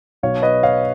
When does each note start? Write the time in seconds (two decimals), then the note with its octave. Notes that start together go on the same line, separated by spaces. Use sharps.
0.23 B1 B2 C#5 F5
0.42 B4 D#5
0.63 C#5 F5